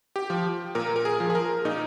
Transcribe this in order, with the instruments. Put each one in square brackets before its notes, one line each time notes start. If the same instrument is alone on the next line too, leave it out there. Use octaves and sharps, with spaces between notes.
[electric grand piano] G4
F3
A#2 A#4
A#4
G#4
F3
G#4
A#4
A#2 D#4